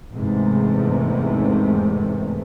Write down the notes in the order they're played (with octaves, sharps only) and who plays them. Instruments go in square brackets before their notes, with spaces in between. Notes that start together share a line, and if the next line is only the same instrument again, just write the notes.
[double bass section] E2 G#2 C3 D#3 A3